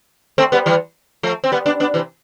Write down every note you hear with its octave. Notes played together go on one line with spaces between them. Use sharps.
A3 C4
G3 B3
E3 G3
F3 A3
C4
G3 B3
B3 D4
B3 D4
C3 E3